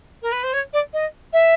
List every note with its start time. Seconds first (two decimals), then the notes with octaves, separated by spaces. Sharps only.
0.22 A#4
0.32 B4
0.43 C5
0.53 C#5
0.73 D5
0.93 D#5
1.33 E5